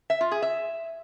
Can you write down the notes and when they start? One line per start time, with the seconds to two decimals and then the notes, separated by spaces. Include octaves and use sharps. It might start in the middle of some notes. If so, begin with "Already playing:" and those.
0.10 E5
0.21 F4
0.31 G#4
0.42 E5